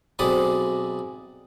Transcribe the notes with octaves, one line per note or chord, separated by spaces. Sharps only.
B1 G#3 C4 D5 B5 D#6